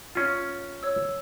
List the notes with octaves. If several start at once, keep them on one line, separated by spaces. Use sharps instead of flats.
C#4 F4
C#5 E6